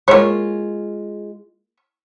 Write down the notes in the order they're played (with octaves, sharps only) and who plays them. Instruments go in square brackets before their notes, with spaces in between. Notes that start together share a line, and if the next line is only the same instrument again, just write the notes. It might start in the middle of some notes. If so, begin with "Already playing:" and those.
[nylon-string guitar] G#3 F4 [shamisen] A#3 C#5